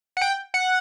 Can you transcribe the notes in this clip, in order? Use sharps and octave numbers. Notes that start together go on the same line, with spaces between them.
F#5
G5
F#5